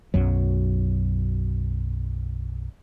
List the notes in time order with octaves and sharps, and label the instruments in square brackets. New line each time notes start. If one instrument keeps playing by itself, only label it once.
[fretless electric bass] B1 F#2 F#3